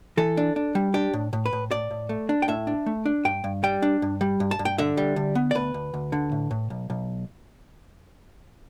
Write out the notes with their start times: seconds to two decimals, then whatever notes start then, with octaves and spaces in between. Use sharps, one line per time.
0.17 E3 A4
0.37 D4
0.56 D4
0.75 G3
0.94 D4 G4
1.14 A2
1.33 A2
1.46 B4
1.53 A2
1.71 A2 D5
1.91 A2
2.09 A3
2.29 D4
2.42 G5
2.48 A2 E5
2.67 D4
2.86 A3
3.06 D4
3.25 G2 G5
3.44 G2
3.64 G3 G5
3.82 D4
4.02 G2
4.21 G3
4.40 G2
4.51 A5
4.59 G2
4.65 G5
4.78 D3 E5
4.97 G3
5.16 D3
5.35 B3
5.51 D5
5.55 D2 B4
5.74 D2
5.94 D2
6.12 D3
6.32 A2
6.51 A2
6.70 B1
6.90 B1